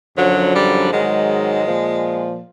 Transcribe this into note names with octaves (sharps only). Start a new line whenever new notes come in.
F#2 D3 F3 F#3
G3
G#2 D#3 F#3 G#3
A#2 F3